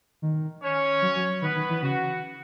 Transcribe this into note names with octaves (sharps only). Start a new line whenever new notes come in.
D#3
C#4 C#5
F#3
F#3
D#3 B3 B4
D#3
E3
C#3 F#4